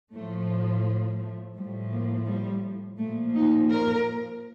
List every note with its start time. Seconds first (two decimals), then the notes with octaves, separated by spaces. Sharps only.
0.13 A2 F3 A3
1.21 A3
1.56 A2 F3 G3
1.91 A#3
2.27 G3
2.98 A#2 F3 A3
3.34 D#4
3.70 A#4